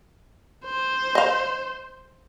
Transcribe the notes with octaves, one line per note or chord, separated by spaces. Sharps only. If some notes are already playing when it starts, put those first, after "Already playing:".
C5
D#5 F5